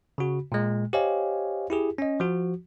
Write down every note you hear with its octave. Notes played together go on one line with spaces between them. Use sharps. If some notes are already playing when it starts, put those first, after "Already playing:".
C#3 F#4
A#2 G#3
G4 C5 C#5 D#5 F5 G#5
E4 G4 G#4
C#4 D#5
F3 F#4